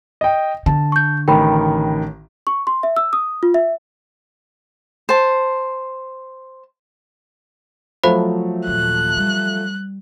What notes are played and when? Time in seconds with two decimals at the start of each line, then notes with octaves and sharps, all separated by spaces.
0.21 D#5 G5
0.66 D3 A5
0.92 C#6 G6
1.28 A1 D#3 G5 B5
2.47 C#6
2.67 C6
2.83 E5
2.97 E6
3.13 D#6
3.43 F4
3.54 E5
5.09 C5 A5
8.04 F3 F#3 A3 C5 F5 B5
8.67 D#2 A#2 F#6
9.17 G3